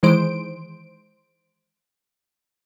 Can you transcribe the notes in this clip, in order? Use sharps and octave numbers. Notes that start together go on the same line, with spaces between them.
D#3 E3 G#3 C5 D7